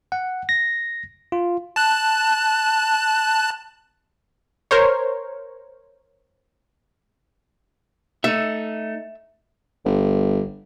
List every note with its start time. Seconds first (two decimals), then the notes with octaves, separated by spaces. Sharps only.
0.12 F#5
0.49 A#6
1.32 F4
1.76 A5 F#6
4.71 A#4 C5 C#5
8.24 A3 D#4 E5
9.85 G1